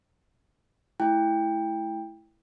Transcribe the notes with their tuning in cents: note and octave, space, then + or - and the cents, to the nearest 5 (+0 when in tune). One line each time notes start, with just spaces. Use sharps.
A3 -25 E4 +0 G5 +15